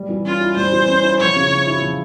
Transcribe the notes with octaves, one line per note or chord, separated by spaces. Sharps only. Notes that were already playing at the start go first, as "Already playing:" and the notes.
Already playing: G3
E3
C#4 F4
E4
G3 C5
E3
C#4
E4
F3 C#5
C#3
C4
E4
F3